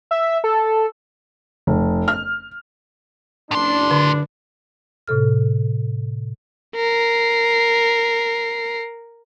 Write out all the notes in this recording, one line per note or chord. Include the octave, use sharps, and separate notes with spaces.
E5
A4
F1
F6
F#1 A2 D4 C6
D3
A2 C3 A4 F6
A#4 C7